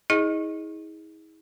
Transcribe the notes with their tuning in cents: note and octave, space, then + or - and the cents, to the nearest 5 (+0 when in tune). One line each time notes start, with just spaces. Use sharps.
E4 -45 G#4 +0 D#5 +0